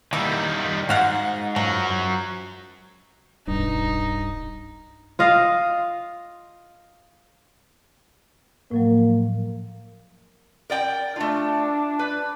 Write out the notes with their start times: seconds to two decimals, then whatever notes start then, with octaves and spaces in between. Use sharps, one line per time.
0.13 D#3 G3 A#3 E4
0.89 G#2 F#4 F5 F#5
1.56 F3 F#3 A#4
3.48 D1 B1 G2 D#4
5.19 F4 D#5 F5
8.71 A2 F3 F#3 A#3
10.70 A#4 D5 G5
11.16 A3 D4 F4
11.99 B4